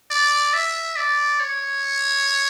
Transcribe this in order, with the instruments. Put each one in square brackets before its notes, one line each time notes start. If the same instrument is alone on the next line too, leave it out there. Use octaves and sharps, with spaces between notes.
[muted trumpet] D5
E5
D5
C#5